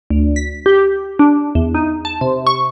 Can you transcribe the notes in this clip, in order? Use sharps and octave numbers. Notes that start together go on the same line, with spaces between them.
D2
B6
G4
D4
E2
D#4
A5
C3
C#6